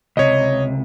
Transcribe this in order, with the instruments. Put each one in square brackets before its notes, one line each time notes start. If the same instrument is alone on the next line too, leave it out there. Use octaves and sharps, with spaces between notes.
[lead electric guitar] C#2 C3 [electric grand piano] C#5 D#5